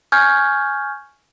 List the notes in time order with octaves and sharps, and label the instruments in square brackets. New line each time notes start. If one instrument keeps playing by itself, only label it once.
[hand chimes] G#5 C#6 F6 G6 G#6